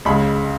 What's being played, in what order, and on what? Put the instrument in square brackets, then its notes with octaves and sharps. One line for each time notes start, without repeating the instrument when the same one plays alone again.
[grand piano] C#2 C#3 G#3 B5